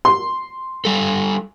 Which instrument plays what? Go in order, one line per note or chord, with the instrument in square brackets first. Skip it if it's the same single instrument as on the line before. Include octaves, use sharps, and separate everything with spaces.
[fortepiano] C6
[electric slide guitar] G3 A4